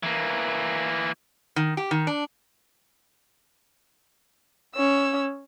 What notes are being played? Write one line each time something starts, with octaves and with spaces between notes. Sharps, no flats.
E3 A#3
D#3
G4
D#3
D4
C#4 E6